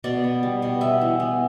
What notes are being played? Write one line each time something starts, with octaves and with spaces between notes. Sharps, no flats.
B2 D5
B3
G3
B2
B3 E5
E3
B3